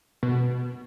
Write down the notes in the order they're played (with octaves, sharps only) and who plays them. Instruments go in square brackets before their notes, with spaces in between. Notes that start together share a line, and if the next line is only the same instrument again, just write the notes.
[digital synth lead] B2